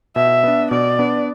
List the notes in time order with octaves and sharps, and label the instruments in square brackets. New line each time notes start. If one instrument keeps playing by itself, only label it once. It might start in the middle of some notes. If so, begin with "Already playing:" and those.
[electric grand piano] B2 [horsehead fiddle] E5
[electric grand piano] B3 D4
[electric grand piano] B2 [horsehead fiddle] D5
[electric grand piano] B3 D4